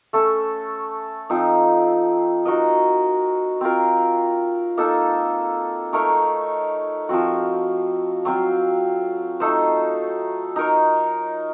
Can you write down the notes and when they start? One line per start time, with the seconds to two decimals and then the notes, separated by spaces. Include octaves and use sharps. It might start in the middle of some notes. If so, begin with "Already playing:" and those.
0.13 A3 C#4 A4
1.30 F3 C4 D#4
2.45 D#4 F#4 A#4 D#5
3.61 C4 F4 A#4
4.77 A#3 D#4 A4
5.93 A3 D#4 A#4 C#5
7.09 F3 C4 F#4
8.25 F#3 C4 F4
9.40 A3 D#4 A4 C5
10.56 D#4 A#4 C#5